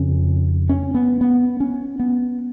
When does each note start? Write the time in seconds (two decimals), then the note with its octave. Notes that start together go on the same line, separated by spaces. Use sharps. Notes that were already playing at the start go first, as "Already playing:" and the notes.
Already playing: F2 C#3 C#4
0.69 C#4
0.94 B3
1.21 B3
1.60 C#4
2.00 B3